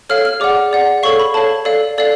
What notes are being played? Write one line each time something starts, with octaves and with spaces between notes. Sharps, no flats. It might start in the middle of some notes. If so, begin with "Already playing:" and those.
A4 C#5 F5 F6
F6
G#4 D5 F#5 D6
G#4 D5 F#5
A4 C#5 F5 C#6
B5
A4 C#5 F5 A5
A4 D5 F5
A4 D5 F5